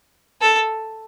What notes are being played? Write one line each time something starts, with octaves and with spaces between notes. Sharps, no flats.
A4